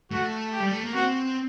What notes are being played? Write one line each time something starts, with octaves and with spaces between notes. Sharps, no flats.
A3 F#4
G4
G3
A3
A#3
C4 F#4